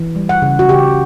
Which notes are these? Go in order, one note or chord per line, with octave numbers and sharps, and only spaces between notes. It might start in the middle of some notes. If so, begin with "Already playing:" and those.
Already playing: E3
G3
F#5
C#3
F#4
C#3 G4